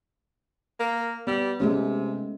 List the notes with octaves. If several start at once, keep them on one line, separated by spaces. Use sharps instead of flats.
A#3
G3 B3
C3 G#3 A3 C#4